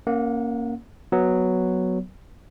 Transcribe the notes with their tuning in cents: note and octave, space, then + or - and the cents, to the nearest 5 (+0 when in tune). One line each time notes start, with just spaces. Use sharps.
A#3 +0 C#4 +0 F#5 -30
F#3 +0 B3 +0